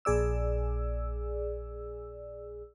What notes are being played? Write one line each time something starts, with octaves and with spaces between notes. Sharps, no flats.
A#1 G#4 D5 E6